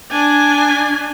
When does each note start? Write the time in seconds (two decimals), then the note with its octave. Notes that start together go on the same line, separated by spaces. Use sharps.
0.11 D4 G#5